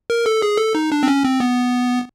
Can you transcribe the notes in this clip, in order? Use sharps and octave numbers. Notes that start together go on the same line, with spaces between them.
A#4
A4
G#4
A4
D#4
D4
C4
C#4
C4
B3